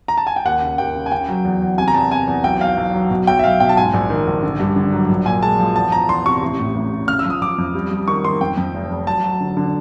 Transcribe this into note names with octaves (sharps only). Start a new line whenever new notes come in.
A#5
A5
G#5
G5
D#2 F#5
C#3
D#2 G5
C#3
G#5
C#3 G5
F#3
E2
E2
C3 G#5
A#5
E2 A5
C3 G#5
E2
B1 G5
B1 F5
B1
F#3
B2
B1 G5
E5
B1 F5
B2 G5
A5
G#2 G#5
A#1
D#3
A#1
D3
G2
D3
F#3
A#1
A#2 G#5
G#3 A5
F3
E2 A5
F3 A#5
E2 C6
C3 C#6
A1
A2
A1
A1
C#3 F6
E6
F3 D#6
F3 D6
F2
G3
G3
D#3 C#6
D#3 C6
F2 G5
F2
F1
F1
F#3 A5
F#3
D3
D3